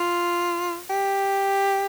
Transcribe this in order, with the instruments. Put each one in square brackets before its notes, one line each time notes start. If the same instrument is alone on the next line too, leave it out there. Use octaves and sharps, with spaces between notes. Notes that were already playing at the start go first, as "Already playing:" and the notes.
Already playing: [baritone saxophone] F4
G4